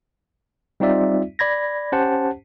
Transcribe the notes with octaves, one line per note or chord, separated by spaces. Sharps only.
G3 C4 D#4 F4 D5 E5
D5 B5 G#6 A#6
C#4 G4 C5 F#5 A5